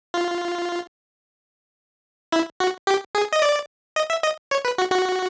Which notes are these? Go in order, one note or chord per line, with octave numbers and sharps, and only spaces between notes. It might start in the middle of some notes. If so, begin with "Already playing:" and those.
F4
E4
F#4
G4
G#4
D#5
D5
D#5
E5
D#5
C#5
B4
F#4
F#4